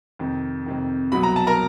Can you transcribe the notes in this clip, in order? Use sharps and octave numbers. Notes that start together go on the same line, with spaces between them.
F2 C3 D#3
F2 C3 D#3
C2 B2 F#3 B5
A#5
A5
A#4 A#5